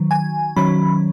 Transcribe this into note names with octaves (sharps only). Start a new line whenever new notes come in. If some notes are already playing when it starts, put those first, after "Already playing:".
Already playing: D#3 F#3
G#5
D#3 F#3 C#4 B5